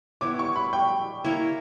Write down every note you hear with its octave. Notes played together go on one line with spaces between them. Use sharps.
B3 E4 G4 C#5 D6
C#6
B5
G5
A#3 E4 A#4 C#5